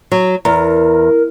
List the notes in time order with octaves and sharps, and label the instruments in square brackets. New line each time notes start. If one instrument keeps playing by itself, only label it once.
[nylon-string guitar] F#3
[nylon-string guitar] E2 [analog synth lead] A#4